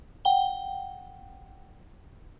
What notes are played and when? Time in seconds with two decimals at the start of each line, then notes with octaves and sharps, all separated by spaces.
0.25 F#5 G5 G7